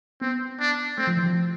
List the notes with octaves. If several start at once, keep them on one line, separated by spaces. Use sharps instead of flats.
B3 C4
D4
A3 C4
F3
E3
F3